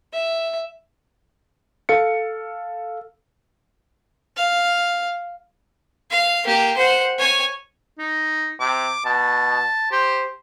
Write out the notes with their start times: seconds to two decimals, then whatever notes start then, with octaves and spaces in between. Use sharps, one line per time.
0.13 E5
1.89 A4 F5 C#7
4.37 F5
6.11 F5
6.45 A#3 G4
6.77 C5 F#5
7.19 C#5 G#5
7.99 D#4
8.60 C3 D6
9.05 B2 A5
9.92 G4 C5